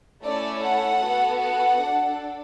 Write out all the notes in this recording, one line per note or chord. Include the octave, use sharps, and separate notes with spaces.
A3 C#4 E4 A4 D5
F#5
B3 F#4 A4
F#5
D4 A4